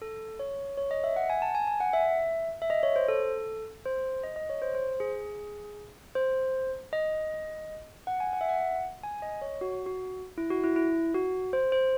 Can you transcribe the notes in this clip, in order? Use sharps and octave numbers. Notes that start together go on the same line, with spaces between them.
A4
C#5
C#5
D#5
E5
F#5
G#5
A5
G#5
G#5
F#5
E5
E5
D#5
C#5
C5
A4
C5
D#5
D#5
C#5
C5
C5
G#4
C5
D#5
F#5
G#5
F#5
E5
F#5
G#5
D#5
C#5
F#4
F#4
E4
F#4
E4
E4
F#4
C5
C5